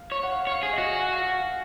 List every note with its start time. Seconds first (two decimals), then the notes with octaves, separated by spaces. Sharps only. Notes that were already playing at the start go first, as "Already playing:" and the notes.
Already playing: F5
0.12 C#5
0.23 F#5
0.32 F5
0.47 C#5
0.52 F5
0.63 G#4
0.73 F#4 D#5
0.93 G#5
1.02 F#5
1.12 F5
1.21 F#5